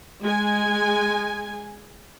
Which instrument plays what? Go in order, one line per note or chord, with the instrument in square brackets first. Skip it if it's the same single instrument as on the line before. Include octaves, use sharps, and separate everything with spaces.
[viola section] G#3 G#5